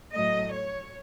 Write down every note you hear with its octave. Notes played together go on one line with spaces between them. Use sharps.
A2 F#3 A3 D#5
C#5